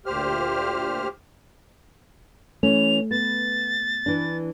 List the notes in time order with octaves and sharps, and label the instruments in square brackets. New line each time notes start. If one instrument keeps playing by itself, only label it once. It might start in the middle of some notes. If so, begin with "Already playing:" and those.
[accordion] D2 A#2 G4 C5 F6
[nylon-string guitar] E3 C#4 [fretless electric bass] A3 [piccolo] F7
[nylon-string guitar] B3 [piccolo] A6
[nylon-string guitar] E3 D4